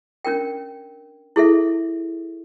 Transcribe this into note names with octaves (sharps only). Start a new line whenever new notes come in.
C#4 D4 A#4 G5
E4 G#4 A4 E5